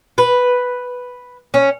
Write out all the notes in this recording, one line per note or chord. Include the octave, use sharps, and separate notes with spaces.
B4
C#4